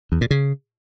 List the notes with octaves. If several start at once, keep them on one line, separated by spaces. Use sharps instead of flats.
E2
A#2
C#3